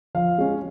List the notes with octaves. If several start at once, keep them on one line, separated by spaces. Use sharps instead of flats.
F3 F5
G#3 C#4